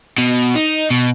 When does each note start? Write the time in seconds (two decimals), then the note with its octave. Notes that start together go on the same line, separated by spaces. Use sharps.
0.18 B2
0.55 D#4
0.91 B2